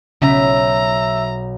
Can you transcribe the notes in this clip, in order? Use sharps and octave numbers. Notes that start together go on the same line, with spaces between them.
B1 C#3 C#4 E5 A#5